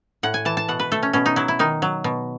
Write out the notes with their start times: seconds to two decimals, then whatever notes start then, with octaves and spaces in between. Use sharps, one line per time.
0.23 A2 F#5
0.34 G#5
0.45 E3 A5
0.57 A5
0.68 B2 F#5
0.80 B4
0.92 A3 A4
1.03 C#4
1.13 B2 C#4
1.26 D#4
1.36 F#3 E4
1.48 E4
1.59 D#3 D#4
1.82 F#3
2.04 B2